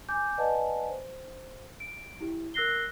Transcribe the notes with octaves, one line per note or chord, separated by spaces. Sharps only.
G#5 D6 G6
B4 D5 D#5 F#5 G#5 A5
C5
D7
E4 G4
A#4 E6 F#6 A#6 C7 G7